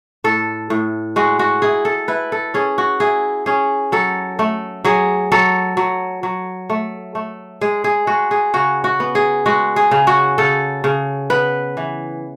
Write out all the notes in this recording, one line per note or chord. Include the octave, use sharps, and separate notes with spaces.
A2 A4
A2
G#3 F#4
F#4
E4 G#4
A4
E4 B4
A4
C#4 G#4
F#4
E4 G#4
C#4 G#4
F#3 A4
A3
F#3 G#4
F#3 A4
F#3
F#3
A3
A3
G#3 G#4
G#4
G#3 F#4
G#4
C#3 F#4
F#4
B3
G#4
G#3 F#4
G#4
C#3
F#4
C#3 A4
C#3
B3 B4
E3